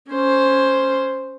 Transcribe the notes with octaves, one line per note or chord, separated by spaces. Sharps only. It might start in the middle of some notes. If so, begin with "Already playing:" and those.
C#4 C5